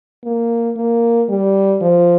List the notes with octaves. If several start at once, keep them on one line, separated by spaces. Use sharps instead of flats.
A#3
A#3
G3
F3